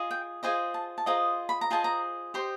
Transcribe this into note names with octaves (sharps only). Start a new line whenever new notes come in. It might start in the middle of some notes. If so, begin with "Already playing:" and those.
Already playing: F4 G#4 D#5
G5
F4 G#4 C5 D#5 G#5
A5
A5
F4 G#4 C5 D#5 A#5
B5
A#5
F4 G#4 C5 D#5 A5
A#5
G4 C5 D#5 C6